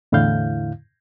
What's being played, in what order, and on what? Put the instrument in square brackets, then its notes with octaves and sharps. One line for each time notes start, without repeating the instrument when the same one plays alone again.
[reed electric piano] E2 A2 D3 E4 F5 G6